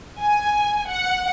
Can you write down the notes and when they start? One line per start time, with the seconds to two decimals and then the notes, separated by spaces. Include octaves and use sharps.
0.20 G#5
0.88 F#5